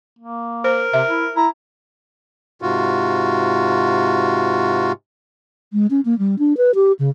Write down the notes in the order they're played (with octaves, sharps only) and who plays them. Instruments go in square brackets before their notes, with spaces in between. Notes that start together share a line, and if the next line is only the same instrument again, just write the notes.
[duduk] A#3
[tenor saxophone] A#4 [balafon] C5
[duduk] C3 [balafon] E5
[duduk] E4
[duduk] E4 [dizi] A#5
[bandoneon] G#2 C3 F4 F#4
[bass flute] G#3
C#4
A#3
G3
D4
B4
G4
C#3